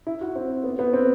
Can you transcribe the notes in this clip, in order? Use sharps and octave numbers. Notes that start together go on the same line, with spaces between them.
E4
F#4
C4
B3
B3
C4